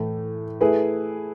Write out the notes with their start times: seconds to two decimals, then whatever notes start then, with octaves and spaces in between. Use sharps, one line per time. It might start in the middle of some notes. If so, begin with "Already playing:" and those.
Already playing: A2 E3 A3
0.61 A3 E4 G#4 B4